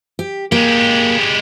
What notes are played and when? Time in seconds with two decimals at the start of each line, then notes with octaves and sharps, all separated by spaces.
0.19 G4
0.52 G#3 A#3 G4